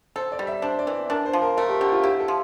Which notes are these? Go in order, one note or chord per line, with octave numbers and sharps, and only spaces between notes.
A4 C5
D5
G3
E5
D4 C5
D5
E3
D4 A#4
C5
F3
A#4
A3 A#4
G4
D3 G4
F4
E4 G4
A4
F3